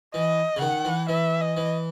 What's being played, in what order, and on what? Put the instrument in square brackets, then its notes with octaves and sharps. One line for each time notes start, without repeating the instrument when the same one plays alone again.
[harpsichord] E3 [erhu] D#5
[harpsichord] C#3
[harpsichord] D#3 [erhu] F#5
[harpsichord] E3
[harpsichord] E3 [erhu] E5
[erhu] D#5
[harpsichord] E3